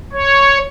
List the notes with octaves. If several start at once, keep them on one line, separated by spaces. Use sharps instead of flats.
C#5